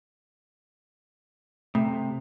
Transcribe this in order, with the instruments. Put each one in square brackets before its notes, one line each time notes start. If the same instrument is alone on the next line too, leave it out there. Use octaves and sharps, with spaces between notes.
[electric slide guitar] C3 [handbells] A3